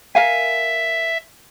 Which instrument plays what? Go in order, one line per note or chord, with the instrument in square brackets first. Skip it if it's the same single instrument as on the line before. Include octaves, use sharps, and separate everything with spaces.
[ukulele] A#4 F5 G#5 [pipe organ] E5